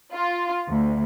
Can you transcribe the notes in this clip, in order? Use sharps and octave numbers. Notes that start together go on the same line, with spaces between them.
F4
D2